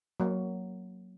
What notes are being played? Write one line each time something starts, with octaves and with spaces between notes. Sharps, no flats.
F#3 A#3